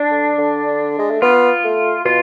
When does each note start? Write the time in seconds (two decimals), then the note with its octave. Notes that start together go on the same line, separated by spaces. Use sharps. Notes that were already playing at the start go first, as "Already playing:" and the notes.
Already playing: D4
0.11 D3
0.38 D3
0.99 G#3
1.10 A3
1.22 B3 F4
1.64 A3
2.05 B2 F4